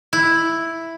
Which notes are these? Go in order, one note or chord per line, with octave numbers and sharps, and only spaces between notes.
E4